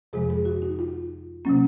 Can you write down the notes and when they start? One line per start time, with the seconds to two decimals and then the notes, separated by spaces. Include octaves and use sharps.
0.13 F2 C3 F3 G#3 G#4
0.30 G#4
0.45 F#4
0.62 D#4
0.79 F4
1.45 C3 F#3 A#3 C#4